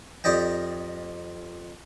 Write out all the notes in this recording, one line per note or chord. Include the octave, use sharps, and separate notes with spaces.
F2 G4 D5 D#5 G5